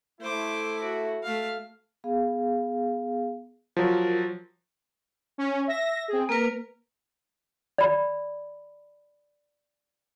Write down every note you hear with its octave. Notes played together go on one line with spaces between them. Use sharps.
A3 E4 C5 D6
F#4
A3 F5
B3 G#4 F5
F3 F#3 F4 A#4
C#4
E5 A#6
C4 G#4
A#3 A#4 B4
D5 B5